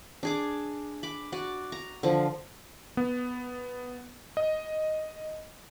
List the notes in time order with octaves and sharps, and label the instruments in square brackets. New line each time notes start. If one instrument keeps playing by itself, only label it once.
[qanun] D4 G#4 D6
B5 D6
F#4 D5
A#5
D3 F3
[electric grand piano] B3
D#5